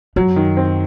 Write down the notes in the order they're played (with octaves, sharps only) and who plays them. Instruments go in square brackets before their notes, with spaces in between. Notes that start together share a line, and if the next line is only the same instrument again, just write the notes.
[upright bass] F#2 [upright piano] F#3
[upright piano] D#3
C4